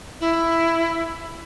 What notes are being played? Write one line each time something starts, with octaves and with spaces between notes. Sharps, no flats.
E4